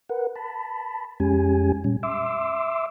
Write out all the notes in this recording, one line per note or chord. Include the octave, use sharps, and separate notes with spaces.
A#4 B4 F#5
A5 B5
F2 G#3 C#4 G4 G#5
A#2 G3 C#4
E5 C6 D6 E6